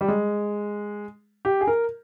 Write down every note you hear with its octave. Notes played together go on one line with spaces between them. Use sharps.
G3
G#3
G4
G#4
A#4